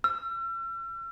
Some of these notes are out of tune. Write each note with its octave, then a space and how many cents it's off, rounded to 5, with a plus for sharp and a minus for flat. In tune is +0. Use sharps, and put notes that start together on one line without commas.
E6 +45